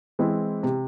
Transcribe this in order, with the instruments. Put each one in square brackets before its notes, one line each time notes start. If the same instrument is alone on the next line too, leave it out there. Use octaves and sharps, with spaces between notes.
[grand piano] E3 G#3 C4 E4
C3